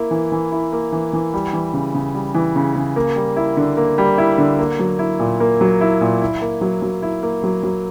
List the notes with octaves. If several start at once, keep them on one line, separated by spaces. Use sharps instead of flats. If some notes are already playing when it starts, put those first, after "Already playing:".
Already playing: A#3 E4
E3
E3
E4
A#3
E3
E3
G3
E3
C#3
C#3
G3
E3
C#3
C#3
A#3
G3
E4
D3
A#3
G3
E4
D3
A#3
F#3
E4
A#2
A#3
F#3
E4
A#2
E4
A#3
F#3
F#3
E4
A#3
F#3
F#3